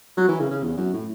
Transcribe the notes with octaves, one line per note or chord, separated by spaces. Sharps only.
F#3
E3
C#3
C#3
E2
F#2
A2